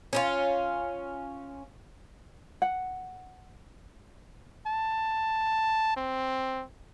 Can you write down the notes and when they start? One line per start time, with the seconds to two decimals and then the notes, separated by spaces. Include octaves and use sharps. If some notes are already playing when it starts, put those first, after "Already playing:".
0.13 C#4 D#4 F4
2.62 F#5
4.67 A5
5.97 C4